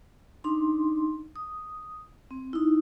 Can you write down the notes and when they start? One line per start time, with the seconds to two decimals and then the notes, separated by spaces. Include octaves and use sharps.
0.44 D4 D#4 C6
1.36 D#6
2.31 C4
2.53 D#4 E4